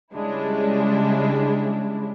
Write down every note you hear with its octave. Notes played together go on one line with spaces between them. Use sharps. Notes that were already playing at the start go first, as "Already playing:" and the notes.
C#3 G3 G#3 D4 E4